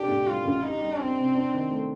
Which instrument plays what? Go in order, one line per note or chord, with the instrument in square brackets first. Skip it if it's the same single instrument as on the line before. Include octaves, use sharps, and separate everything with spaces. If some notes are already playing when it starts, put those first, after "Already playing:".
Already playing: [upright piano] F1 D4 [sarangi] G4
[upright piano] A2
[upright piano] G3 [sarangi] F4
[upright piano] A1
[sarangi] D#4 [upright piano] G4
[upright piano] G3
[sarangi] C4 [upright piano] D4
[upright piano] C3
D4
D#3
A3